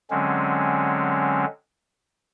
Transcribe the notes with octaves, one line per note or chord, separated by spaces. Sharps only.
D3 F#3 G#3 C4 C#4